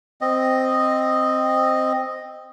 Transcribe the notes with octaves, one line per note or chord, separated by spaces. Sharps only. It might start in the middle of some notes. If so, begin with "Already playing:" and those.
C4 D#5